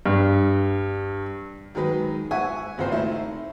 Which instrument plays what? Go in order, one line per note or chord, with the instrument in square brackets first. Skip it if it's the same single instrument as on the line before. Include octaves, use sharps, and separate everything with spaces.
[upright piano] G2
[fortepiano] D#3 F#3 G#3 B4
E5 F#5 G#5 C#6
G#1 C#2 C4 C5
A3 D#4 E4